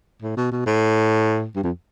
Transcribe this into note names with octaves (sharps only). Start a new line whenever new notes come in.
A2
B2
B2
A2
G2
F2